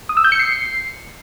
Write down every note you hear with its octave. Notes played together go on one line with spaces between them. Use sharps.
D#6
E6
G6
C#7
C7